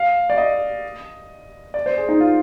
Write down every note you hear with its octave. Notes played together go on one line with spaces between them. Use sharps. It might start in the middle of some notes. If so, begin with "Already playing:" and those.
Already playing: F5
D5
D#5
D5
C5
G#4
D#4
F4